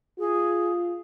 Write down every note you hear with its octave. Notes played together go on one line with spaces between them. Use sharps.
F4 G#4